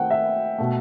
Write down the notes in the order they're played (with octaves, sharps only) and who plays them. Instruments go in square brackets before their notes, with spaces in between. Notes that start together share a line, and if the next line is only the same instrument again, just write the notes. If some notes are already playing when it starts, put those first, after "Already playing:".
Already playing: [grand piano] D#3 A3 C4 [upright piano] F#5 G5
[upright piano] E5
[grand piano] B2 A3